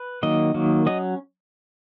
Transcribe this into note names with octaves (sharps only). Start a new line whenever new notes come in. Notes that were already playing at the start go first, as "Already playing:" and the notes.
Already playing: B4
D#3 F#3 A#3 D#5
D#3 F#3 A#3
F#3 C#4 D#5